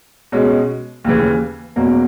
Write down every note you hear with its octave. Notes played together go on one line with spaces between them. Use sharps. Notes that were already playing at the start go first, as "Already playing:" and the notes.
B2 G#3 C#4
D#2 C#3 E3
E2 B2 F#3 A#3 C#4